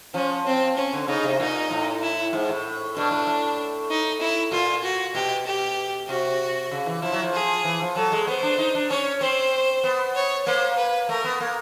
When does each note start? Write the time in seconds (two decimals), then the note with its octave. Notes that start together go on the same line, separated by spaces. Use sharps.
0.14 F3 C#4
0.46 C4
0.77 C#4
0.93 D3
1.08 C#3 D#4
1.23 C3
1.39 A#2 D#4
1.71 A2
2.02 E4
2.33 G#2
2.49 A2
2.96 B2 D4
3.11 A2
3.27 A2
3.90 D#4
4.21 E4
4.52 A#2 F4
4.84 F#4
5.15 B2 G4
5.46 G4
6.08 C3 F#4
6.71 C#3
6.86 E3
7.02 F3 E4
7.13 F#3
7.22 F3
7.34 G#4
7.65 E3
7.81 F3
7.96 F#3 A4
8.12 G#3
8.27 B3 C5
8.43 D4
8.58 D#4
8.75 D4
8.89 C#4 C#5
9.21 C4 C5
9.84 B3
10.15 C#5
10.47 A#3 C5
10.77 B4
11.09 A3 A#4
11.24 B3
11.40 A#3